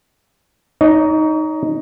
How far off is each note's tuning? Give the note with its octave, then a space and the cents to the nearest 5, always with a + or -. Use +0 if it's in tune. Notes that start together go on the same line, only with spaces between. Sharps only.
D#4 +5 C#5 +40